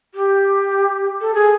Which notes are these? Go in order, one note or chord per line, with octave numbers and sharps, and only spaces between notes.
G4
A4
G#4